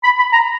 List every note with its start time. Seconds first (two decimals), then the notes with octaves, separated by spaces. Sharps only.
0.03 B5
0.17 B5
0.32 A#5